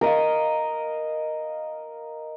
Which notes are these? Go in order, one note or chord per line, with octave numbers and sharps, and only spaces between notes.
A#4 D#5 F5